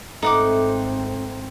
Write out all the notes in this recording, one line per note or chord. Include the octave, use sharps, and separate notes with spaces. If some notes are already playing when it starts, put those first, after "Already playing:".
G#1 A3 C4 D#4 F#5 D6